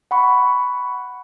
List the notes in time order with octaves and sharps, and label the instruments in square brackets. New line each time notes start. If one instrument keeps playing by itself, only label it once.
[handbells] F#5 B5 C#6